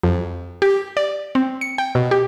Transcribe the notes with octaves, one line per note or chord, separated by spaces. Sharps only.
F2
G4
D5
C4
C#7
G5
B2
G4